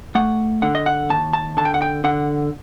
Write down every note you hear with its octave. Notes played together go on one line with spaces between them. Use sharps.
A3 F#5
D3 F#5
D#5
F#5
D#2 A5
A5
D3 A5
G5
F#5
G5
D3 F#5